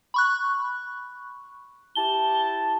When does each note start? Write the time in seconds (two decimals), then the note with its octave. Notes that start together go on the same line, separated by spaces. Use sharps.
0.14 B5 C#6 F#6
1.95 E4 G4 A5 G7